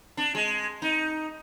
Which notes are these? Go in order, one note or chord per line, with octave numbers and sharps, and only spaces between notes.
D4
G#3
D#4